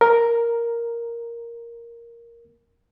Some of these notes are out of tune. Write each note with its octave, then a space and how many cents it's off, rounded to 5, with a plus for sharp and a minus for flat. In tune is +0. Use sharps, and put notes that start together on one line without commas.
A#4 +0